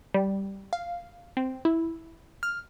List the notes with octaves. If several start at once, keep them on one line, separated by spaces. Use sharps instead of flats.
G3
F5
C4
E4
F6